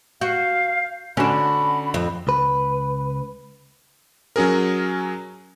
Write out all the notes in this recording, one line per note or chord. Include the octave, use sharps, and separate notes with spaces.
F#4 F5 G6
D3 C#4 D4 F#4 B5
F2
C#2 B4
F#3 C#4 G#4 A#4